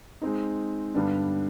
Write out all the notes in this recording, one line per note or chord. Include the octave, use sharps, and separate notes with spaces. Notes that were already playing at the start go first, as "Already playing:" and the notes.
G#3 C4 D#4
G2 D3 G3 B3 D4